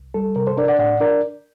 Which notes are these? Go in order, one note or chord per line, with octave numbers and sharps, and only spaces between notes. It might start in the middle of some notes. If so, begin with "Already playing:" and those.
Already playing: C2
G3 A4
C3 A#4
A4 C5
D4 A#4 D5
D5 F#5
A2 D5 F#5
D4 A#4 D5